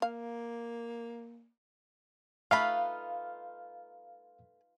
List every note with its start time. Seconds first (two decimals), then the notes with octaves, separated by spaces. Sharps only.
0.02 A#3 F5
2.51 A3 D#4 F4 B4 F5 B5